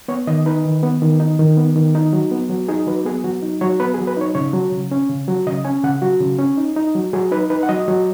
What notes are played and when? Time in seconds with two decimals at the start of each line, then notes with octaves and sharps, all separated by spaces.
0.08 B3 C#5
0.27 D#3 D#5
0.46 D#4 B4
0.65 D#3
0.83 B3
1.02 D#3
1.20 D#4
1.39 D#3
1.57 B3
1.76 D#3
1.95 D#4
2.13 F#3
2.31 B3
2.50 F#3
2.68 D#4 G#4
2.87 F#3 B4
3.05 B3 G#4
3.24 F#3 F#4
3.42 D#4
3.61 F#3 C#5
3.80 B3 B4
3.94 G#4
3.98 F#3
4.07 B4
4.17 D#4 C#5
4.35 C#3 C#5
4.53 F#3
4.72 C#3
4.91 C#4
5.09 C#3
5.28 F#3
5.46 C#3 D#5
5.65 C#4 G#5
5.84 C#3 F#5
6.02 F#3 F#4
6.21 C#3
6.39 C#4
6.58 D#4
6.76 D#4
6.95 F#3
7.13 F#3 G#4
7.32 D#4 B4
7.50 D#4 B4
7.63 F#5
7.69 F#3 D#5
7.88 F#3